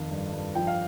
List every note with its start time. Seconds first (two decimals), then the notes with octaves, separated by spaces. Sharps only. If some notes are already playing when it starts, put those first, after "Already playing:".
Already playing: F2 D#3 F5
0.11 G2
0.33 G2
0.55 F3 G5
0.67 F5